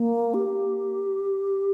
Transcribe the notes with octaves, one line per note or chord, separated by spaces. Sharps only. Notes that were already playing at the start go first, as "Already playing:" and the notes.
Already playing: A#3
G4